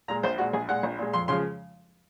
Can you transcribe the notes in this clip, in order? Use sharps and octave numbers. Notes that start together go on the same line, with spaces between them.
A#2 G#3 A#5
A#1 C5
A#2 G#3 F#4
A#1 G#4
A#2 G#3 F#5
A#1
A#2 G#3
F2 C6
C#3 F3 G#3 C6